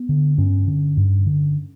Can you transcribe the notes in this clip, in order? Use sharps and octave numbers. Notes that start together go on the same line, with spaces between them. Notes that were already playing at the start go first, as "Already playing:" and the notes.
Already playing: B3
D3
G2 C#4
D3
G2
D3